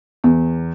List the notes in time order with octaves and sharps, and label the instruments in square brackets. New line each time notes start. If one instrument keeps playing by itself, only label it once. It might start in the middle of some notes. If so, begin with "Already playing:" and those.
[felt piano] E2